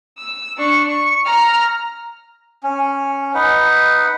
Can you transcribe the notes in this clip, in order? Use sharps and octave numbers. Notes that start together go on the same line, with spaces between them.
E6
D4 C#6
C#6
A#5 F6
C#4
D#4 B4 F#5